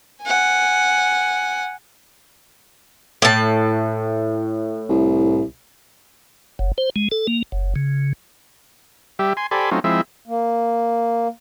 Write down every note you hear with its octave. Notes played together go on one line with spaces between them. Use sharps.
F#5 G#5
A2 A5
C2
F#1
C5
G#3
A4
A#3
F#1
C#3
G3 G4 E5
G#5 C6
G4 A4 C5 D5 G#5 B5
F#3 A3 C4 C#4 D#4 F4
F3 G#3 C4 E4 E5
A#3